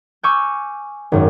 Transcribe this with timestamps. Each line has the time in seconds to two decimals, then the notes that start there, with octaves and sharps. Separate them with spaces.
0.23 G#5 C#6 D6 E6 F6 G6
1.12 G#1 F#2